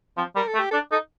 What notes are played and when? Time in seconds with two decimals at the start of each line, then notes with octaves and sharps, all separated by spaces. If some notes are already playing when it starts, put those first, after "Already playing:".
0.17 F3 C4
0.36 G3 A#4
0.47 A4
0.54 A3
0.59 G4
0.71 D4 A4
0.92 D#4 A4